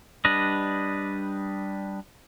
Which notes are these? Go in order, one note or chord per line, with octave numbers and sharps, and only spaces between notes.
G3 D4 B4 D#5